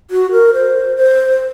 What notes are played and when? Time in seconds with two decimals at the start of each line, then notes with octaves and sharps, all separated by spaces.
0.11 F#4
0.32 A#4
0.54 C5
0.96 C5